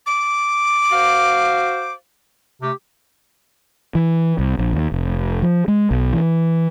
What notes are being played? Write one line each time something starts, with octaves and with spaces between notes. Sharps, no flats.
D6
F#4 C5 F5
C3 A3 G4
E3
C2
A#1
D#2
F1
F3
G#3
B1
E3